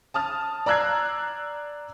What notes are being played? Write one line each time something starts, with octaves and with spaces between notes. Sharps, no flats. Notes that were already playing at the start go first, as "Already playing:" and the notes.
A5 D#6 F6 A6
D5 A#5 E6 F#6 G#6 C7